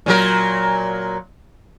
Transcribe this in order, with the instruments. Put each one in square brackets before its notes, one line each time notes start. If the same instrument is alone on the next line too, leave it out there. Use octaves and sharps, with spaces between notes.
[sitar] A#2 F#3 A#4